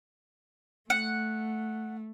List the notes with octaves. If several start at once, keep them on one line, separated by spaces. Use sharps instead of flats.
A3 F#5